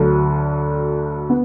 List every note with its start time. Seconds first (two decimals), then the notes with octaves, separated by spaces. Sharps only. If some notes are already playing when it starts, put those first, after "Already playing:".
Already playing: D2 D3 F#3
1.30 B3